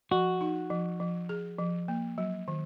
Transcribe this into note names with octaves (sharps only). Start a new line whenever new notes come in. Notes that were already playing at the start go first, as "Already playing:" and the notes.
F3 F#4
D#4
F3
F3
G#4
F3
A#3
F#3
D#3